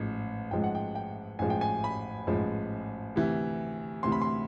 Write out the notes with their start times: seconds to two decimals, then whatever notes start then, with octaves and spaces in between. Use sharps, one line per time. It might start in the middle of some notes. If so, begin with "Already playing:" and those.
Already playing: A1 G#2 F3 G#3
0.51 A1 G#2 F3 G#3 G5
0.64 F#5
0.75 G5
0.95 G5
1.39 A1 G#2 F3 G#3 G#5
1.50 G5
1.61 G#5
1.84 B5
2.27 A1 G#2 F3 G#3
3.16 D2 C3 E3
4.03 D2 C3 E3 C6
4.12 B5
4.21 C6